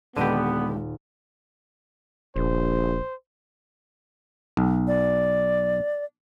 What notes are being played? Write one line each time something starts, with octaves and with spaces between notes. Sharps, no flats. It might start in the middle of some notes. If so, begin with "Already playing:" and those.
D#1 D3 G#3 B3 G4 D#7 E7
D#1 A#1 C5
B1
D5